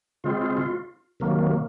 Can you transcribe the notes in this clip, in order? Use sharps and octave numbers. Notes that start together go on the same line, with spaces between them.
C#3 G#3 C4 F4
F4
F4
C3 D#3 F#3 A#3